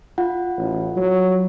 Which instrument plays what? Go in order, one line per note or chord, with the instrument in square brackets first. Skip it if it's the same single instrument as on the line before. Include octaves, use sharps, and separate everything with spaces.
[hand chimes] F4 F#5
[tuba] A1
F#3